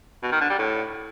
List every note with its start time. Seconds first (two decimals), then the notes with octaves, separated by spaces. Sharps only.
0.23 B2
0.32 D#3
0.41 D3
0.50 G3
0.59 A2